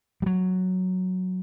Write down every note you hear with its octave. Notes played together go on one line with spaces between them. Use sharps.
G3
F#3